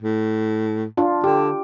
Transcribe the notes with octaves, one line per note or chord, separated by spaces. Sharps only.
A2
D4 F4
D3 G4